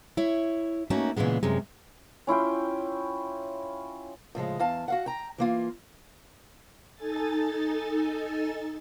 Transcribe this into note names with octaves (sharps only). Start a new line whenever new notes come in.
E4 C#5
A3 A#3 C#4 D#4 F#4
A#2 C#3 E3 G#3 B3
F#2 C3 G#3
C#4 E4 F4 G5
A2 C#3 F3 G#3
E2 F5 A5
F#4 F5 F#5
G5 A#5
E3 A#3 F4
D#4 A4 G#5 A6